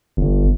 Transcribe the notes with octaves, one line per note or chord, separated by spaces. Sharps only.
G1